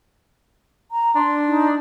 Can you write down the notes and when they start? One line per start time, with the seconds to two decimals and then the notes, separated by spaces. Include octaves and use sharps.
0.91 A#5
1.16 D4 C6
1.48 D#4